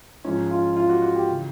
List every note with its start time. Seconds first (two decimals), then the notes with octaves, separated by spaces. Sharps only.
0.24 G#2 F3 G#3 C#4
0.51 F4
0.76 F4
0.89 F#4
1.02 F#4
1.15 G4
1.28 C#3 E3